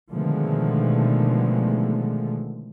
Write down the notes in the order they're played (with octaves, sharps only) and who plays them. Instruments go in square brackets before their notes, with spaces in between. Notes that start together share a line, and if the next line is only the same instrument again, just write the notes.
[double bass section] B2 D3 D#3 F3 G#3 A3